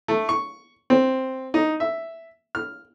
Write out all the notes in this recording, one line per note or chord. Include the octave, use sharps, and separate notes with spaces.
A3
C#6
C4
D#4
E5
F6